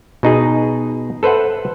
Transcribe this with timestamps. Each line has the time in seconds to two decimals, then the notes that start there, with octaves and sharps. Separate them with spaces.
0.23 B2 D#4 G#4
1.23 A4 B4 C5 E5 F#5